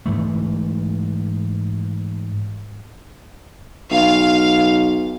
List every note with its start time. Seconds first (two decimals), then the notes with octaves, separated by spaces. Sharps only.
0.06 G#2 E3 A3
3.91 B1 F5